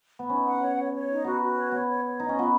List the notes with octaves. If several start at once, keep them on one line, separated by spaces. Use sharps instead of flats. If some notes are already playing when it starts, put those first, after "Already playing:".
B3
C#4 D#4
F#5
C#5
C#5
C#5
D#4
B3 F#4
F#4
C#5
B3 C#5
C#5
C#5
D#4 D#5
C#4
B3 F4